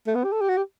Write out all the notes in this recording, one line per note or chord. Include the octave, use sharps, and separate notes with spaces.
A3
B3
G4
A4
G4
F#4
G4